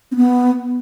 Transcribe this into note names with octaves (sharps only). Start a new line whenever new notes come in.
C4
B3